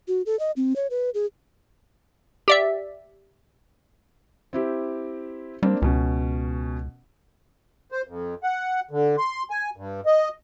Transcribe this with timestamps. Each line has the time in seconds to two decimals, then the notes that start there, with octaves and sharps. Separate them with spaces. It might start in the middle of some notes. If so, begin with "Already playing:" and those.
0.08 F#4
0.26 A4
0.39 D#5
0.56 C4
0.76 C#5
0.90 B4
1.14 G#4
2.48 G4 D5 E5
4.53 C4 E4 G4
5.63 G3 A#3 C4 D4
5.82 C#2 B2 C#4
7.92 C5
8.07 F2
8.44 F#5
8.91 D3
9.18 C6
9.50 G#5
9.76 G2
10.06 D#5